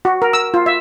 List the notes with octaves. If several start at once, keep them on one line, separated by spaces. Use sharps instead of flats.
F#4
A#4
E6
F4
E5